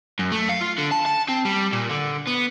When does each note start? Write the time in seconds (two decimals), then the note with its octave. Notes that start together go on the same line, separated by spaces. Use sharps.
0.19 F#2
0.32 A3
0.49 F5
0.61 F4
0.78 D3
0.92 A5
1.06 A5
1.29 C4
1.45 G3
1.73 A#2
1.89 D3
2.27 B3